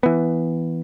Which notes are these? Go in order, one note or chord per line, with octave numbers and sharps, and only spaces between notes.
E3 B3